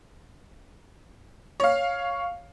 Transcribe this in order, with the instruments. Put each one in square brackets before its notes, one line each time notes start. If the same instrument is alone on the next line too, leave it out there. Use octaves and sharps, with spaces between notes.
[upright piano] C#5 F5